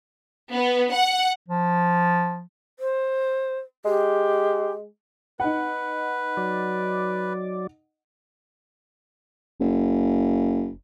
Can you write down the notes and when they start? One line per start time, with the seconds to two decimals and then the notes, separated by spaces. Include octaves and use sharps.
0.53 B3
0.94 F#5
1.49 F3
2.80 C5
3.85 G#3 G4
5.40 D#4 B4 F#5
6.37 F#3 D5
9.60 F#1